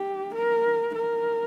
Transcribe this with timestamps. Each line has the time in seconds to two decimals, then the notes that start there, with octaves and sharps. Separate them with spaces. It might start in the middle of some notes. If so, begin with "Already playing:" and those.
Already playing: G4
0.35 A#4
0.96 A#4